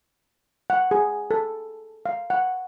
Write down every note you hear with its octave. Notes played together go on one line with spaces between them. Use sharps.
F#5
G#4
A4
F5
F#5